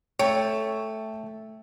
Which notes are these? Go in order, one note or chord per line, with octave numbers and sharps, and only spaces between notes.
A3 C#5 G5 C#6